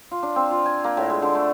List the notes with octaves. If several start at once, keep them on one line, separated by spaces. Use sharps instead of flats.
F4
D4
C4
F4
G#5
A#3
A2
G#3
D3
A3